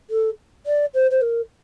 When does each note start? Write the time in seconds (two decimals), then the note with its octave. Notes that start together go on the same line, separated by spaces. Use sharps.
0.10 A4
0.66 D5
0.94 C5
1.11 C5
1.21 A#4